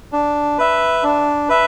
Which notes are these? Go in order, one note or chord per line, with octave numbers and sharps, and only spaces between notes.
D4
B4 E5
D4
B4 E5